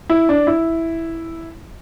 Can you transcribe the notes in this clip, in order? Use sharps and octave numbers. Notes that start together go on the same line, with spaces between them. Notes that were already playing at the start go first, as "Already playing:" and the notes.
E4
D4
E4